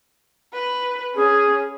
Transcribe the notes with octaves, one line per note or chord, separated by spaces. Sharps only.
B4
C#4 G#4